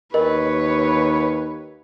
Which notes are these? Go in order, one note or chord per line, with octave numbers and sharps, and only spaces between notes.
D#2 A#4 B4 C#5 D#5